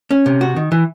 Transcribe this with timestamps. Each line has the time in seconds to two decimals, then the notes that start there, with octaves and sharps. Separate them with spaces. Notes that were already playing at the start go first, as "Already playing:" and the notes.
0.11 C#4
0.26 C3
0.41 F#4
0.56 D#3
0.72 E3